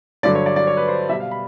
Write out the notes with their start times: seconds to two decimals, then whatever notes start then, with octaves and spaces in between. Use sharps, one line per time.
0.23 G2 D3 F#3 D5
0.35 C#5
0.46 D5
0.56 D5
0.67 C#5
0.77 B4
0.88 C5
1.09 B2 G3 E5
1.20 F5
1.31 B5